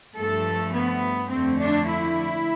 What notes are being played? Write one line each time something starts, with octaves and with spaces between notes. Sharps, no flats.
G2 F3 A3 A4
B3
F2 D3 A3 C4
D4
E4